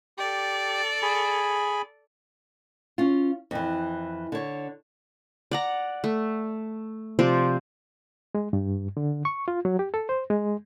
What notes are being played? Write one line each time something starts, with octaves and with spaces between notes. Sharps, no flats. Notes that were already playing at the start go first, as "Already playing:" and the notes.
G4 A4 D5
G#4 G#5 B5
C#4 F4
F2 E3
D3 C#5
D5 F#5 A#5
A3
C3 F3 C5 D5
G#3
G2
D3
C#6
F4
F#3
G4
A4
C5
G#3